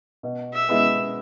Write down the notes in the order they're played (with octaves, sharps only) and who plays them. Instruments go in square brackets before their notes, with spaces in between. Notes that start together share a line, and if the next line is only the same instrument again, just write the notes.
[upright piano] B2
[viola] E5
[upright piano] G#3 B3 E4